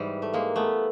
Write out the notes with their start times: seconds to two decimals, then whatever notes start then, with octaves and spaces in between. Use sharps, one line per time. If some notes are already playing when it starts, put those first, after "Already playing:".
Already playing: G#2 E3 G3
0.22 A3
0.34 G#3 A#3
0.56 A3 B3